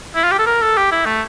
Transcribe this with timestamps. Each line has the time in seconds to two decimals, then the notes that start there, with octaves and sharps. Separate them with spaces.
0.15 E4
0.24 F4
0.31 G4
0.39 A4
0.46 A#4
0.61 A4
0.77 G4
0.92 E4
1.06 A3